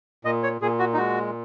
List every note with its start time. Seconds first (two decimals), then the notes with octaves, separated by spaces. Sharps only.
0.25 A#2 D#5
0.43 C#5
0.61 A#2 G#4
0.79 F#4
0.94 D#4
0.97 G#3 F#4